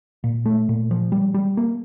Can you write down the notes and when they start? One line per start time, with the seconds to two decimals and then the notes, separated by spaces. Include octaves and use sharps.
0.24 A#2
0.46 A3
0.69 A#2
0.91 F3
1.12 G3
1.34 G3
1.57 A#3